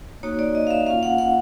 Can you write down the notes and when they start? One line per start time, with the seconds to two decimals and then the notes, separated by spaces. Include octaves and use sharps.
0.23 A#3 D#4 F#4 C#5
0.39 D5
0.55 D#5
0.67 F5
0.71 E5
0.86 A#3 C#4 F4 F5
1.03 F#5
1.18 F#5